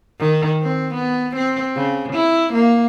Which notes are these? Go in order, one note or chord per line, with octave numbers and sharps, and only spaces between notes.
D#3
C4
B3
C4
C#3
E4
A#3